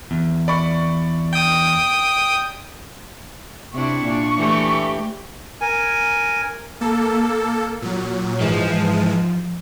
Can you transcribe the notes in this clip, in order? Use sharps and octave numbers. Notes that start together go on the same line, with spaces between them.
E2
D5 B5 C#6
G5 D#6
C3 D4 E4 C#6
A#2 D4
E3 A3 G4
A#4 G#5
A#3 A4
A#2 F#3
G#2 E3 F3 G#3